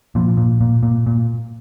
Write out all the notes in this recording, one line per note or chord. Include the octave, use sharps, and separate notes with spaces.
A#2 F3
A#2
A#2
A#2
A#2